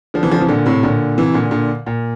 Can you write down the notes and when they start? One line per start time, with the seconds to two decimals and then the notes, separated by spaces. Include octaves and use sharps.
0.14 D3 F3
0.23 C3 E3
0.32 D3 F3
0.40 C3 E3
0.48 A#2 D3
0.66 A2 C3
0.83 A#2 D3
1.17 C3 E3
1.34 A#2 D3
1.51 A#2 D3
1.86 A#2